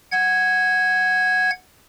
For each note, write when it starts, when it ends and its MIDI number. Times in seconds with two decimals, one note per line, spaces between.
0.12 1.51 78
0.12 1.51 92